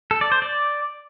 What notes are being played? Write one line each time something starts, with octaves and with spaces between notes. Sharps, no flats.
A4
D5
C5
D5